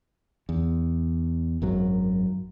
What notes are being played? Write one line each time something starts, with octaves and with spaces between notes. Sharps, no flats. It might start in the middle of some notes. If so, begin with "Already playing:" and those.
E2
G#1 F#2 F#3